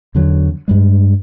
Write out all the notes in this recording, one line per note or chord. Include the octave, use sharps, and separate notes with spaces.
E2 D3 F#3
G2 G3 G#3